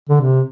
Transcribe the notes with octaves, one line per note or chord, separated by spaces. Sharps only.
D3
C3